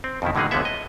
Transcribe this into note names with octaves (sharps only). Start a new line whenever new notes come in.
C4
F2 B2 D#3 E4
A2 D3 F#3 A#3 D#4 G#4
C#2 D3 F3 G#3 B3 E5
D#5